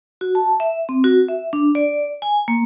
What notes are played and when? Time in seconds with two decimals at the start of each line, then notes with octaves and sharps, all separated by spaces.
0.21 F#4
0.35 A5
0.60 E5
0.89 C4
1.04 F#4
1.28 E5
1.53 D4
1.75 D5
2.22 G#5
2.48 A#3